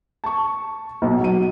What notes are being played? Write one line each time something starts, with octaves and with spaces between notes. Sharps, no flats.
A5 C#6
B1
F#3 D#7